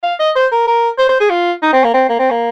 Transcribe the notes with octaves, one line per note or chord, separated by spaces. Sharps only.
F5
D#5
C5
A#4
A#4
C5
C5
G#4
F4
D#4
C4
A#3
C4
A#3
C4
A#3